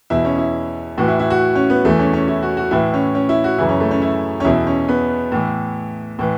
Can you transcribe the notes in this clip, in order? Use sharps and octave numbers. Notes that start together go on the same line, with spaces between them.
E2 B2 E4
C#4
E4
A2 E3 F#4
E4
E4
F#4
C#4
B3
E2 E3 A3
C#4
C#4
E4
F#4
F#4
A2 E3 E4
C#4
C#4
E4
F#4
F#2 C#3 E3 E4
C#4
A3
C#4
E4
C#4
E2 B2 E4
C#4
B3
A2 E3
A2 E3